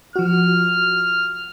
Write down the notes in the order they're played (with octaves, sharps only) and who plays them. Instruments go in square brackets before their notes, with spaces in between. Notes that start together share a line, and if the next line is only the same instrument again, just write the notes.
[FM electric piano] F3 F#4 [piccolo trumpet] F6